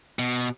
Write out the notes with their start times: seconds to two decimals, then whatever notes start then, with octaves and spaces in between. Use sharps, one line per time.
0.19 B2